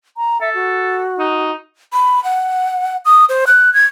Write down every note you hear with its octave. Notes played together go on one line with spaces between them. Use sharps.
A#5
A4 E5
F#4
D#4
B5
F#5
D#6
C5
F#6
G#6